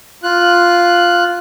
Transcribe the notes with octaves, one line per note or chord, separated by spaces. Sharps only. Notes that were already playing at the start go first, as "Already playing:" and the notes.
F4 F#6